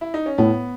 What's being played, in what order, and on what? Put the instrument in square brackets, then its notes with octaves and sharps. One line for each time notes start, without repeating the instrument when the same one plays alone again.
[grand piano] E4
D#4
C#4
[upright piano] A2 [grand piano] B3